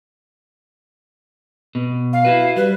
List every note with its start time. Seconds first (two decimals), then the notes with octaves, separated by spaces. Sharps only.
1.75 B2
2.13 F5
2.25 E4 F#4 B4
2.56 G3 B4